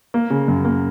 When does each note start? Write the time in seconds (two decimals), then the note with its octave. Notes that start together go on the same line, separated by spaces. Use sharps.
0.14 A#3
0.30 C#3
0.48 F#2
0.65 A#3